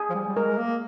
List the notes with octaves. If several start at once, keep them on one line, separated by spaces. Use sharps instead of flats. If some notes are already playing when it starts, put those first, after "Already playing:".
Already playing: G#4
F3
G3
G3
G#3 A#4
A#3